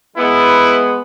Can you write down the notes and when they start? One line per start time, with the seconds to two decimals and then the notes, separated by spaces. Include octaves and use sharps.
0.17 G#3 B3 E4